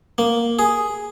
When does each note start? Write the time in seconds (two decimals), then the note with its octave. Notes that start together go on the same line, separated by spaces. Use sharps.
0.18 A#3
0.59 G#4